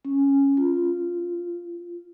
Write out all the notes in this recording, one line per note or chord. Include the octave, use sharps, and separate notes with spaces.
C#4
F4